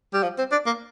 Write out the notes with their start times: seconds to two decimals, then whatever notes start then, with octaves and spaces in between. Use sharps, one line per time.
0.14 G3
0.23 F3
0.38 C4
0.52 D4
0.66 A#3